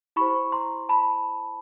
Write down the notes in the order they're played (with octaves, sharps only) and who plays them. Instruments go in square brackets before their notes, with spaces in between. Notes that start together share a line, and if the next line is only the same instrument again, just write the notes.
[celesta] E4 G4 C5 B5 C#6
A#5 C6
A5 B5